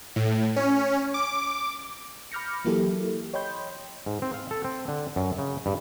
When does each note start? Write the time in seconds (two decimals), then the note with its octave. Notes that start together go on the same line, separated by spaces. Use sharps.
0.16 A2
0.56 C#4
1.14 D6
2.32 B5 D6 F6 G6 A#6 C#7
2.65 E3 F#3 A#3 E4 G4 A4
3.34 C#5 D#5 G5 B5 C6 G6
4.06 G#2
4.22 C4
4.34 F5
4.51 A4
4.65 C4
4.88 D3
5.16 F#2
5.39 C#3
5.66 G2